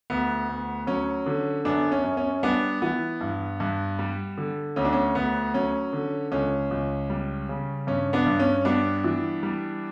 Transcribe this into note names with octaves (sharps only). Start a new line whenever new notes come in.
D2 B3
D2
F#3 C#4
D3
F#2 B3 D4
C#4
F#2
C#4
G3 B3 D4
E3 B3
G2
G2
G3
D3
D2 C#4
D4
C#4
D2 B3
F#3 C#4
D3
C#2 C#4
C#2
G3
C#3
G2 C#4
B3 D4
G2
C#4
G3 B3 D4
E3
G3